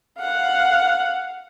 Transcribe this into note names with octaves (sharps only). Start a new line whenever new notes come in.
F5 F#5